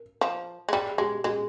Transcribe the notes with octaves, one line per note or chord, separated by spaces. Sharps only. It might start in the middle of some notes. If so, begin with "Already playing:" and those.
Already playing: A#4
F3
G#3
G3 G#4
G#3 G4
G#3 G#4